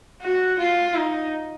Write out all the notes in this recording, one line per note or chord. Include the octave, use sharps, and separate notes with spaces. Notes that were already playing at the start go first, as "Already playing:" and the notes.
F#4
F4
D#4